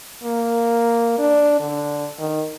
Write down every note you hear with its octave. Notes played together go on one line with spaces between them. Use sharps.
A#3
D4
D3
D#3